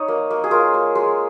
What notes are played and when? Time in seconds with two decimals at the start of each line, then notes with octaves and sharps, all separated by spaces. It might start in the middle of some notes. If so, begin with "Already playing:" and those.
Already playing: D#4 C#5 D#5
0.08 A#3
0.30 A#3
0.44 G#4
0.51 F4 A#4
0.74 A#3
0.95 G#3